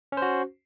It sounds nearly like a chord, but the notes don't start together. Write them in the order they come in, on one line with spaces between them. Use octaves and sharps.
C#4 C5 F#4